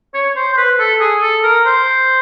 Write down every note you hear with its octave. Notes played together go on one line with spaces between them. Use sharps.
C#5
C5
C5
B4
A4
G#4
A4
A#4
C5